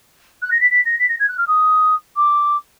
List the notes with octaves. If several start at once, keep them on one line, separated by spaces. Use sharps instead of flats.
F#6
A#6
B6
B6
A#6
B6
A#6
G#6
F#6
F6
D#6
D6